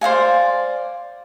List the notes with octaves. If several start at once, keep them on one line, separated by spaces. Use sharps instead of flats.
C5 D5 F5 G#5